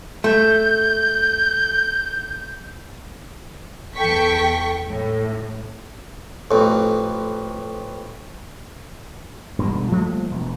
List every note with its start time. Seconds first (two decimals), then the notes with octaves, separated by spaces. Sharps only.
0.24 A3 G6
3.96 E2 A4 G5 C#6 B6
4.90 A2
6.51 A1 F2
9.58 E1 G2 B2 D3
9.92 F3 G3 A3 A#3
10.31 E1